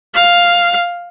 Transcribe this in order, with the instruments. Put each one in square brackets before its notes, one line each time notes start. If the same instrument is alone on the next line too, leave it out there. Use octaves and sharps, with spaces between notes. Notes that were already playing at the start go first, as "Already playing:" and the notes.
[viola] F5